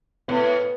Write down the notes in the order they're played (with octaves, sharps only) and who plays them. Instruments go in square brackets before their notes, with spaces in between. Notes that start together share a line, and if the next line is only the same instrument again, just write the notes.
[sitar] A2 [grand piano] B3